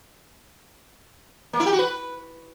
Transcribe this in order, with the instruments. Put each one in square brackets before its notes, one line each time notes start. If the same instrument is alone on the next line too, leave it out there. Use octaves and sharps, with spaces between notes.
[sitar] A#3
E4
G4
F#4
B4